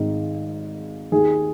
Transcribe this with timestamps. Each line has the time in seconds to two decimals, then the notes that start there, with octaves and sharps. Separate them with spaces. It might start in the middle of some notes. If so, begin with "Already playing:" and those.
Already playing: G#1 G#2 D#3 D#4
1.12 D#2 D#3 G#4